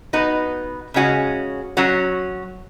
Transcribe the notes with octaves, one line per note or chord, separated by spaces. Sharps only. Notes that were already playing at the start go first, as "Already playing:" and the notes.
B3 D#4 F#4 B4
C#3 G#3 C#4 F#4
F#3 C#4 F#4 C#5